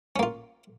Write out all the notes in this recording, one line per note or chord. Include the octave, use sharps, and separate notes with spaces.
A#3 C#4 F4